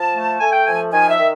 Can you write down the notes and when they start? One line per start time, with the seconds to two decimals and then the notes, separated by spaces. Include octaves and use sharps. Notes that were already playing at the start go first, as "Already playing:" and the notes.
Already playing: F3 A5
0.13 A3
0.40 A3 G#5
0.52 G5
0.66 F3 G#5
0.92 D#3 G#5
1.10 E5
1.19 D#3